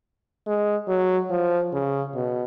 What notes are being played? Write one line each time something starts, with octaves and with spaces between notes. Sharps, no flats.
G#3
F#3
F3
C#3
B2